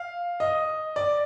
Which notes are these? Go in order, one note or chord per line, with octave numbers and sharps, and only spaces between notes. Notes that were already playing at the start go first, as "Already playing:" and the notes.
Already playing: F5
D#5
D5